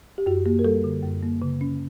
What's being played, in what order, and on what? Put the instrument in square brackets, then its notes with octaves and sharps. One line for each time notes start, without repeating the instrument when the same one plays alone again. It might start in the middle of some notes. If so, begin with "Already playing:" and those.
[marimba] G4
F#2 F#4
A#3 G4
A#4
G3 A4
D3
F#2
A#3
C#3
C#4